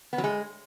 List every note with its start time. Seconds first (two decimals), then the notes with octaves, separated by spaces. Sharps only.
0.13 B3
0.18 F#3
0.24 G#3